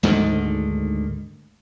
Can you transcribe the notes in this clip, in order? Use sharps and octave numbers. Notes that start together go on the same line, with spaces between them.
D2 G#2 D3 D#3